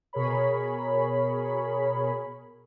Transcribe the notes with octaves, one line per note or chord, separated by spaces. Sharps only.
B2 G#4 A#4 C#5 B5